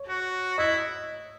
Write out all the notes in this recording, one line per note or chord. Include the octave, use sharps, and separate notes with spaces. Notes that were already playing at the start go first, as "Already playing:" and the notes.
Already playing: C#5
F#4
E4 D#5